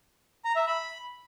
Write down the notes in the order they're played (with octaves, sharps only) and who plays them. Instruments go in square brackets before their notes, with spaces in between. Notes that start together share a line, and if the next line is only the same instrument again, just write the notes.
[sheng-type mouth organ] A#5
E5
B5